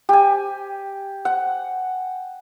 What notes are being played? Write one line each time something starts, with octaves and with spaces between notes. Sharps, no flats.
G4 G#5
F#5